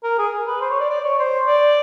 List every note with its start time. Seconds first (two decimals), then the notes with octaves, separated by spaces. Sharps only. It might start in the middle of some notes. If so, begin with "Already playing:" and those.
0.04 A#4
0.19 G#4
0.47 B4
0.61 C5
0.71 C#5
0.80 D5
0.90 D5
1.04 C#5
1.19 C5
1.47 D5